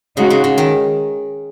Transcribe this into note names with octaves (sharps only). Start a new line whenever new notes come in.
C#3 G#3 D#4 F#4
C#3
C#3
D#3